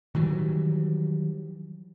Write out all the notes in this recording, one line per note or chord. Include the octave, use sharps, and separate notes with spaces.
D#3 E3 F#3 G3